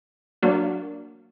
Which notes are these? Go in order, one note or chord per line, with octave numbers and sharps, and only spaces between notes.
F#3 A#3 D4 F#4